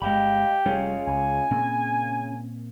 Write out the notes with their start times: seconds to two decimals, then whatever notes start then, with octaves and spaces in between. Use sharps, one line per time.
0.02 G1 G#3 G4 D#5 F5 B5
0.66 F1 G3 C#4 F4 G#4
1.07 C#2 G#5
1.51 A#2 C#3 A#3 C4